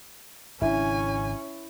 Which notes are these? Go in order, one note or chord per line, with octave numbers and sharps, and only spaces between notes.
G#1 C#3 C#4 D4 E4 G#5